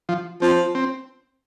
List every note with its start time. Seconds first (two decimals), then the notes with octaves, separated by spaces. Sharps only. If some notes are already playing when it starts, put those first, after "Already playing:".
0.09 F3
0.42 F3 C4
0.75 C4